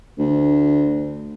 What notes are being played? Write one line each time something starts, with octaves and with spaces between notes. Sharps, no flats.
D2